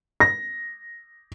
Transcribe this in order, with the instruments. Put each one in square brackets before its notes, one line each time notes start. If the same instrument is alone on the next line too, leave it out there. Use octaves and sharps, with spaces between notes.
[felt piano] A#6